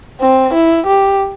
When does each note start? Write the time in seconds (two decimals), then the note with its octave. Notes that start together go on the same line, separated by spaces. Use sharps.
0.21 C4
0.54 E4
0.86 G4